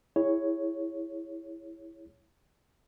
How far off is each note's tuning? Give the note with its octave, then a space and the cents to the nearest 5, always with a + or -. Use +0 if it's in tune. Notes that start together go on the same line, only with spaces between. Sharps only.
E4 +0 G#4 -35 C#5 +0